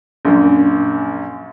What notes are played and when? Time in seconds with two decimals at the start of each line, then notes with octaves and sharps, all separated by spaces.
0.25 A#1 F#2